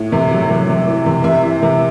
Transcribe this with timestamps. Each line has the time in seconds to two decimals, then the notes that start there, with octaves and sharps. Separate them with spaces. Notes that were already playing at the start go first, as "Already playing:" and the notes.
Already playing: A2
0.12 C3
0.31 F#3
0.50 C3
0.69 C3
0.87 E3
1.06 C3
1.24 C3 E5
1.43 E3
1.62 C3